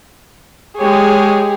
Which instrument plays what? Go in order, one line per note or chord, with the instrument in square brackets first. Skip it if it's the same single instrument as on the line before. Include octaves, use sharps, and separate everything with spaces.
[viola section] G#3 C#5 [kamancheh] G4 G#4